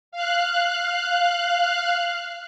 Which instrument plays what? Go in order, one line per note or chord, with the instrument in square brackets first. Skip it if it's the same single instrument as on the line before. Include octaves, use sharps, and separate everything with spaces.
[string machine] F5 F#6